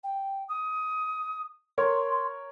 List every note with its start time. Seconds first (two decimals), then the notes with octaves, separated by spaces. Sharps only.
0.03 G5
0.48 D#6
1.78 A#4 C#5 C6